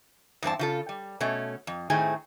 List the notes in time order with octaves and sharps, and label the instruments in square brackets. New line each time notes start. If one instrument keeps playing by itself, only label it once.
[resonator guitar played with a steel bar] E2 G2 C4 A5
C#3 F4 A4
G3
B2 A3 C#4
F2
A2 D#3 A3 C4 G#4 G#5